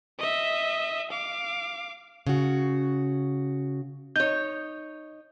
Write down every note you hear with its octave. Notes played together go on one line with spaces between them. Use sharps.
D#5 E5
F5 D6
C#3 F#4
D#4 C#5 G6